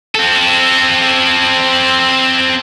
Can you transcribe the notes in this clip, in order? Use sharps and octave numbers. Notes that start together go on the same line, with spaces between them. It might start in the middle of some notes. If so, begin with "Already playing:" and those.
C4 A4